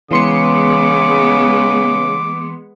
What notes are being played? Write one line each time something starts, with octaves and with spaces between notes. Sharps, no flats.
C#3 E3 G#3 B3 C6 D6 C#7